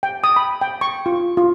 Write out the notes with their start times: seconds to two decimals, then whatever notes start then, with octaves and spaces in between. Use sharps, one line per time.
0.03 G5
0.24 D#6
0.36 B5
0.61 G5
0.81 C#6
1.06 F4
1.37 F4